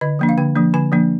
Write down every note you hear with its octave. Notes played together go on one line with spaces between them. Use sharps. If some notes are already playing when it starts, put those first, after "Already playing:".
D3 D#5
F3 A#3 D4
F5
D3 G5
F3 A#3 D4
D3 G#5
F3 A#3 D4